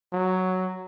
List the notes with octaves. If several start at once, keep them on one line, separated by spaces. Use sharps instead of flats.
F#3